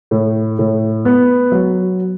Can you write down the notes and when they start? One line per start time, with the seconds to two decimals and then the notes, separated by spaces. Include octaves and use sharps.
0.11 A2
0.59 A2
1.05 B3
1.52 F#3